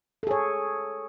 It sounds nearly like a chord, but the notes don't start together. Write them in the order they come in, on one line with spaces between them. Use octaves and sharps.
A4 G#4 C#5